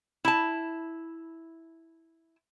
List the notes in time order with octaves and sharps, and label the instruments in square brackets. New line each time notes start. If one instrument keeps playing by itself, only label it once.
[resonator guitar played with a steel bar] E4 A5